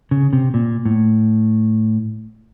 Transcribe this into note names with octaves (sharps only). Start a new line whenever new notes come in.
C#3
C3
A#2
A2